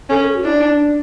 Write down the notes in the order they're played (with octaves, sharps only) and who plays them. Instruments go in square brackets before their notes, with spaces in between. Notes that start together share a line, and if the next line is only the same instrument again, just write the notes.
[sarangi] C#4 [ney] A4
[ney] A#4
A4
F#4
[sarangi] D4 [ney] E4
[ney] D#4
D4